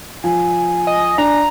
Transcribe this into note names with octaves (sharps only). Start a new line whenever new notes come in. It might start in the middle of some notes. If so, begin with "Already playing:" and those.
F3 G#5
D#5
D4 A#5